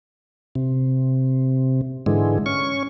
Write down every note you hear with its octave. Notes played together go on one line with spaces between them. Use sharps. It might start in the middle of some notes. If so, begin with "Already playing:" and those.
C3
G#2 D3 E3 G#3
C#4 C#6